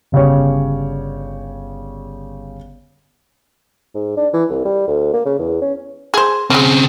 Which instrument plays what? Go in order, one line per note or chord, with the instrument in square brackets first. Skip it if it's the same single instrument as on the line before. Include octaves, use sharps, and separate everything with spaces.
[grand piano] G1 C#3 G4 C#5
[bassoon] G#2
D4
E3
C2
G3
D2
A#3
C#3
E2
C#4
[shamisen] G#4 C5
[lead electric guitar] C#3 C4 [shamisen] G#3 C#4